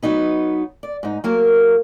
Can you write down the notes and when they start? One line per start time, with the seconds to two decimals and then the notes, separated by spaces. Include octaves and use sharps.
0.03 F#3 B3 D#4 B4
0.83 D5
1.03 G#2 D#4
1.24 F#3 A#3 A#4